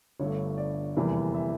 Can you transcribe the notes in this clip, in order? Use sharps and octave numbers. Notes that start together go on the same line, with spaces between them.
G1 G2 D3 A3 C#5
D5
F1 E2 E3 G3 A#3
E5